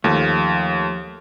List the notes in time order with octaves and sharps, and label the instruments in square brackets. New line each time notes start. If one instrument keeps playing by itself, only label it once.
[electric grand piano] D#2 [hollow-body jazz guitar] F3 A3